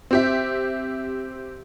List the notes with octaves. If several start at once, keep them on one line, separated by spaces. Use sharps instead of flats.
C4 G4 E5